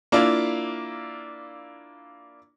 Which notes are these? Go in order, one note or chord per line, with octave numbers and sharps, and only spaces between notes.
A#3 D4 E4 F4